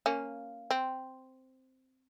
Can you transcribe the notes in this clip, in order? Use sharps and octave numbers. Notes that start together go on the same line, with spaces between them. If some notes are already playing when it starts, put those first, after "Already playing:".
A#3 C#4
C4